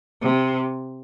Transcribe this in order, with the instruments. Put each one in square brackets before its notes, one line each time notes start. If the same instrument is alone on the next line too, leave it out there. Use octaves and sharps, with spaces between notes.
[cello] C3